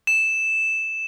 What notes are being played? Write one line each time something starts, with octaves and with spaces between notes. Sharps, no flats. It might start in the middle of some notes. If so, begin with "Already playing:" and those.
E7